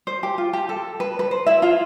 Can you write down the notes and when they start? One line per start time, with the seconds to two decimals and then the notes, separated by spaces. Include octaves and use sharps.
0.07 C5
0.23 G4
0.38 F4
0.53 G4
0.69 A4
1.00 B4
1.19 B4
1.31 C5
1.46 E4 E5
1.62 F4 F5